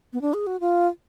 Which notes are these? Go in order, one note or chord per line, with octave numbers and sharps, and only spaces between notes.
B3
D4
G#4
F#4
F4